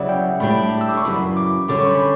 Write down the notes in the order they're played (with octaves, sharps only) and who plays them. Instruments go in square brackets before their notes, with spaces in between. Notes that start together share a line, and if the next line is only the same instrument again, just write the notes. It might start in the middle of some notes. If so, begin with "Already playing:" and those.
Already playing: [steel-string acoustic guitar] C#3 F#3 B3 E4 [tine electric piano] D5 E5
[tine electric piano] G5
[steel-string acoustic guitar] A2 G3 D4 G4 [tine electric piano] B5
[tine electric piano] E6
D6
C#6
[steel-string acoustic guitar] F#2 C#3 E3 [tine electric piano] B5
[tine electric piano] D6
[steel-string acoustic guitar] D3 G3 C#4 [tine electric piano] D6
[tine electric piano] C#6
B5